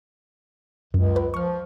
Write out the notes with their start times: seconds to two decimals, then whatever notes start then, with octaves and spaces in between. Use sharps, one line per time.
0.94 C#2 F#2
1.16 B4
1.34 F3 C#6 F6